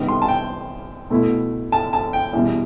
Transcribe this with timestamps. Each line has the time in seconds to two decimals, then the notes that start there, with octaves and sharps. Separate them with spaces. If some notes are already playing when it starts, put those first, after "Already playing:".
Already playing: C3 D#3 G3 B3
0.09 C6
0.22 A5
0.28 G5
1.10 B2 A3 E4
1.72 A5
1.93 A5
2.13 G5
2.33 E2 B2 G3